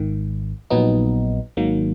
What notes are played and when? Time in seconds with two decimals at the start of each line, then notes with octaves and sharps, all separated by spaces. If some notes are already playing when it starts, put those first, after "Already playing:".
Already playing: G#1 G#2 D#3
0.70 A#1 A#2 F#3 B3 D#4
1.57 G#1 G#2 D#3 F#3 A#3